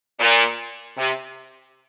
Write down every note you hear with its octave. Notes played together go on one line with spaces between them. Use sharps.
A#2
C3